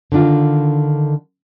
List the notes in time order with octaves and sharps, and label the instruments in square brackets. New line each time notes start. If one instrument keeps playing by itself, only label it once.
[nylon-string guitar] D3 D#3 D4 F4